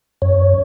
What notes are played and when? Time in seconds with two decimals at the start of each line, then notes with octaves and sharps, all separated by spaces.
0.22 F#2 C#5